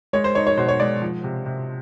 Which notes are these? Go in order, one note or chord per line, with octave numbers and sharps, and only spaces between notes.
G#3 C#5
C5
D#4 C#5
C#5
B2 C5
C#5
G#3 D5
F3
C3
C3